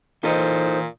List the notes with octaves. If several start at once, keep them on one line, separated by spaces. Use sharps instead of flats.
A#2 E3 D#4 A4 C5 D#5